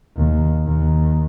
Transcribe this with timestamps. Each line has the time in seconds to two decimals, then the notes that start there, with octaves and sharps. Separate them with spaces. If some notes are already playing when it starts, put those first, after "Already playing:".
0.16 D#2
0.65 D#2